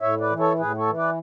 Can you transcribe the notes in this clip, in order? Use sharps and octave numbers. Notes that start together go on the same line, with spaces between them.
A2 C#5 E5
B4 D5
E3
A4 C#5
A2 G#4 B4
A4 C#5
E3
B4 D5